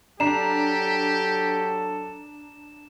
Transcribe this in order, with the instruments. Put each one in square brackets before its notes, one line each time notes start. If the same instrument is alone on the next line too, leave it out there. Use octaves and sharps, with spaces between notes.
[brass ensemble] F#3 A4 [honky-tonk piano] D4 A#5 C7 [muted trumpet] G4 [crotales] E7